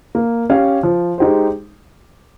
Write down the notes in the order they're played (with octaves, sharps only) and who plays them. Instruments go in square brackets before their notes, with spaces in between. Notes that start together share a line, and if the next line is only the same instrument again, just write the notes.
[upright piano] A#3
C#4 G4 C#5 F5
F3
G#3 D#4 G4 C5